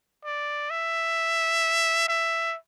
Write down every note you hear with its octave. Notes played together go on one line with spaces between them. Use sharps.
D5
E5
E5